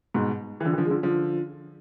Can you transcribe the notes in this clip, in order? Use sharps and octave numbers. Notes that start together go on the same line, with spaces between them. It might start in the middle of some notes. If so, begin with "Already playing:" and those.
G#2 B2
E3
D3 F3
E3
D3 F3
G#3
D3 F3
D3 F3